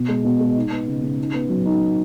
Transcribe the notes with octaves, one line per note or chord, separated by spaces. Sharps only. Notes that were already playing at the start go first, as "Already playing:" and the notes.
Already playing: B2
G#3
B2
G#3
D#4
B3
C#3
C#3
D#4
B3
F#3
D#4